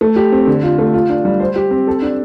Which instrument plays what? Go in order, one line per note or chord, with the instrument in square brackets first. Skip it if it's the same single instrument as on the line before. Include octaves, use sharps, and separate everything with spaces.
[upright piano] A3
G4
C4
D3
F4
A3
F4
D4
G3
C5
G4
C4
A4
D4